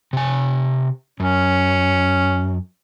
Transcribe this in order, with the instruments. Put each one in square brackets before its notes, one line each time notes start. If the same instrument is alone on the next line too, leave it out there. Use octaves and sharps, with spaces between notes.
[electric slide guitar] C3 G#5
[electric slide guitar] F#2 [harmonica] C#4